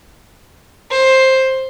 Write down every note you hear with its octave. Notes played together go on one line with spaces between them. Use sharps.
C5